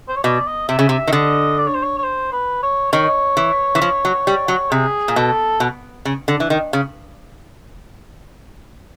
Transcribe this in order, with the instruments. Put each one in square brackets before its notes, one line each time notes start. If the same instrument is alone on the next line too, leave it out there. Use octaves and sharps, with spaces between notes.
[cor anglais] C5
C#5
[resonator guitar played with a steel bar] B2 [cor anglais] D5
[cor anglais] D#5
[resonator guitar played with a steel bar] C3 [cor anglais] E5
[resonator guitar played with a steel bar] C#3
[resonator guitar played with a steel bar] C3 [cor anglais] E5
[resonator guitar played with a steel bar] D#3
[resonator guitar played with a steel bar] D3 [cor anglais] D#5
[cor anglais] D5
C#5
C5
C#5
C#5
C5
B4
C#5
[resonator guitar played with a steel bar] D#3 [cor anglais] C#5
[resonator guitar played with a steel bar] E3
E3
F3
F#3
G3
F#3
[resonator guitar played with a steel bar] C3 [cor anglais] G#4
[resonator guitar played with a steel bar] A#2
[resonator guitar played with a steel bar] B2 [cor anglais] A4
[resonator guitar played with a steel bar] B2
C#3
D3
E3
D#3
C#3